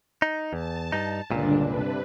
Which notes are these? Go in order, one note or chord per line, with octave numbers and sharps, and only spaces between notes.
D#4
E2 A5
G2 D#4
C#2 G2 A#2 D3 D4
C3 B4